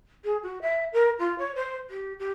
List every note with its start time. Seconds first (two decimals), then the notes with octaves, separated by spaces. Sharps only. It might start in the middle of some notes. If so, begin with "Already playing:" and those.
0.24 G#4
0.42 F#4
0.61 E5
0.93 A#4
1.18 F4
1.38 C#5
1.55 C5
1.90 G4
2.19 G4